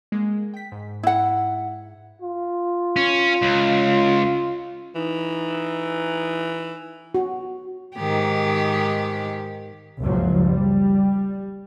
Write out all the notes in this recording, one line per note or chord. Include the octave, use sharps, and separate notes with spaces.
G#3 A#3
G5 B6
G#2
E4 F#5
F4
C#4
C#2
E3 D#4
F#4
G#2 D#3 G4
F#1 C#2 F3 F#3
G3